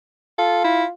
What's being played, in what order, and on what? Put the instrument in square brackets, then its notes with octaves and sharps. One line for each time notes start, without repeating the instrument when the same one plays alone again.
[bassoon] F4 [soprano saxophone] A4
[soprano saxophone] E4